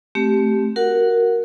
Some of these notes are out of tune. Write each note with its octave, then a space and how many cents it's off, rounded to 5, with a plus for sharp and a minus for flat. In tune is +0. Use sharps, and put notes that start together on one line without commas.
A3 -15 C4 +0 G4 -10
F#4 +0 A#4 +0 F#5 -5